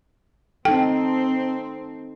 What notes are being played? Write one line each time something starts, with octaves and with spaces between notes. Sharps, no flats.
C4 D#4 A4 G5